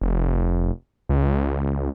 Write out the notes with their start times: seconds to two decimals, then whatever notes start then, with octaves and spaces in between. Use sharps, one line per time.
0.01 F1
1.09 C#2